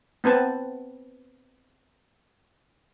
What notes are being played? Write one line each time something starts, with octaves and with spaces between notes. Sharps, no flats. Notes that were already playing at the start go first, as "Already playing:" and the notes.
B3 C4 B4 A5